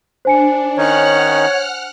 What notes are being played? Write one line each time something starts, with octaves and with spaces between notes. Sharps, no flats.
D4 C5 G#5 C#7
D#3 C#4 D#4 C#5 F#5 F6 F#6